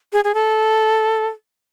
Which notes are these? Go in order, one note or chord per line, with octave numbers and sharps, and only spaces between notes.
G#4
G#4
A4